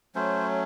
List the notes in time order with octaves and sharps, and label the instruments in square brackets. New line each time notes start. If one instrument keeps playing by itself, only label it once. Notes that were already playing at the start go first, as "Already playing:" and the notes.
[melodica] F#3 A3 C#4 C5